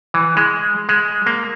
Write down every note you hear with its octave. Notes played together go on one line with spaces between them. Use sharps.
E3
G#3
G#3
A#3